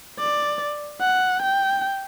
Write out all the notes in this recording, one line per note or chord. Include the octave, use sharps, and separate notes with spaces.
D5
F#5
G5